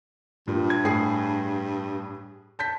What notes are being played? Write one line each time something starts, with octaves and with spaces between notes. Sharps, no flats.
G2 A#2
G#6
A2 G#4 C7
A5 G6 B6